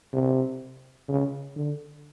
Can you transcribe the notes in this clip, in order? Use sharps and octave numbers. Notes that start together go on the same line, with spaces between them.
C3
C#3
D3